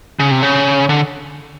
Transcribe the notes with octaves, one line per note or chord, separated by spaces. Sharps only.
C#3
C3
C#3
D3